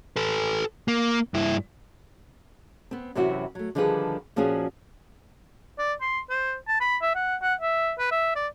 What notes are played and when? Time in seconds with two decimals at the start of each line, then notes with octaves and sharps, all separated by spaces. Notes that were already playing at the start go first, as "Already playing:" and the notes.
0.16 A4 B4
0.88 A#3
1.34 G2 E4
2.91 B3 C4
3.15 F#2 C3 E3 C4 E4 F#4
3.55 F#3 A3
3.75 D3 D#3 F3 G3 G#4 B4
4.36 A#2 F3 C4 C#4 F#4 G#4
5.78 D5
6.01 C6
6.30 C5
6.68 A5
6.81 B5
7.02 E5
7.15 F#5
7.42 F#5
7.61 E5
7.99 B4
8.11 E5
8.36 D5